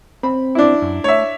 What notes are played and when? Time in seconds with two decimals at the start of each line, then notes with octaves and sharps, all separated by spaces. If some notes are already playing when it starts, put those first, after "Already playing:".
0.23 C4 B5
0.55 D4 E4
0.82 F#2
1.04 A3 C#5 E5